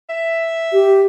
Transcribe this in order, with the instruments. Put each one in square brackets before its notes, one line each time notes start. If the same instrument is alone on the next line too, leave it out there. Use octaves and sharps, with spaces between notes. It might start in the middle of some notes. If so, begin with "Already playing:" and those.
[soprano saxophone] E5
[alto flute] G4